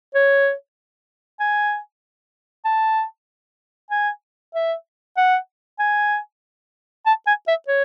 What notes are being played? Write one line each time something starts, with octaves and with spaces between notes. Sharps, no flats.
C#5
G#5
A5
G#5
E5
F#5
G#5
A5
G#5
E5
C#5